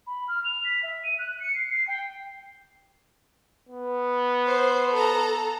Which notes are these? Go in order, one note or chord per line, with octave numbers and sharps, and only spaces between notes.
B5
F6
F7
B6
E5
D#7
F#6
C#7
C7
C7
G5
B3
C5
A4 A#5